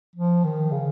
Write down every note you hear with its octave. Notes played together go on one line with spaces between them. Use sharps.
F3
D#3
C#3